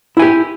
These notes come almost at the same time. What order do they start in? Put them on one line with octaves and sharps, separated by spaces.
E4 G#5 G4